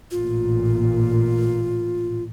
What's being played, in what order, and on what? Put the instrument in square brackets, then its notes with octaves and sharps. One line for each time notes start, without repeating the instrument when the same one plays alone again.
[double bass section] A1 A#2 [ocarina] F4